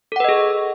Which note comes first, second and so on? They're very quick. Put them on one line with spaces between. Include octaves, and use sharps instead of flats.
A4 F#5 B4 D#5 G#4